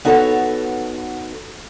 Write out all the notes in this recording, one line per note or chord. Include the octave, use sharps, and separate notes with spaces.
B3 D#4 F#4 A4 C#5